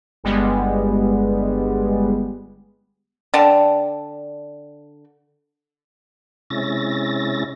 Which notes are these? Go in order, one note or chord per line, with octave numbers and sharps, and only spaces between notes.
G1 G3 G#3 B3
D3 D5 G5 A5
C3 G#3 C#4 E4 A6 A#6